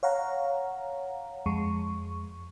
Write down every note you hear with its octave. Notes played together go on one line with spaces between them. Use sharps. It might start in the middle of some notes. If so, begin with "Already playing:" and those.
C#5 F5 F#5 A#5
F2 G#3 C#6